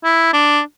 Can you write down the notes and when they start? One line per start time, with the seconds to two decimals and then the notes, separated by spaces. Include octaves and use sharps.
0.04 E4
0.33 D4